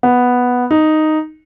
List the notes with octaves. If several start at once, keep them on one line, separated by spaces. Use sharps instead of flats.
B3
D#4